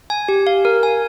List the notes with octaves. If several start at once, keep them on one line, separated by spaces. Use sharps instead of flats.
G#5
G4
F5
A#4
G#5